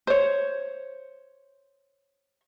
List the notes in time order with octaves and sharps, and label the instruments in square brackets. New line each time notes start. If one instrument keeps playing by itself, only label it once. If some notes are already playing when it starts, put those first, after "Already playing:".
[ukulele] C5 C#5